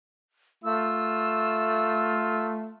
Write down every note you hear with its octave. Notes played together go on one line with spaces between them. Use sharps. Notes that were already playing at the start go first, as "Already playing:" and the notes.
A3 F4 E6